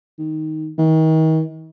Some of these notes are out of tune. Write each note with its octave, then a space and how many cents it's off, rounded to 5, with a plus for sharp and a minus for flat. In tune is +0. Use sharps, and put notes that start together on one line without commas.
D#3 +5
D#3 +35